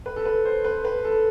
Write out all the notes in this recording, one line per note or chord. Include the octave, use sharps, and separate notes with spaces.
B4
A4
B4
C5
B4
B4
A4